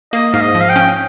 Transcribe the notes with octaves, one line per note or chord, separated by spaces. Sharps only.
A#3 D#5
G#2 F5
D#5
F3
F5
G5
C#4